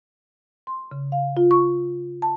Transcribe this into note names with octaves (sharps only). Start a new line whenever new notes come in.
C6
C#3
F5
F4
C#6
A5